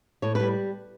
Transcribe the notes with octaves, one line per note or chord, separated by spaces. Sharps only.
A2 C#5
G3 B4